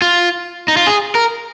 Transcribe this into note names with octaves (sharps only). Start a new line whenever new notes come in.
F4
D#4
F4
G#4
A#4